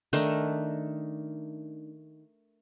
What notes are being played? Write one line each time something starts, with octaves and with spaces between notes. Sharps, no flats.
D#3 A3 D4 D#4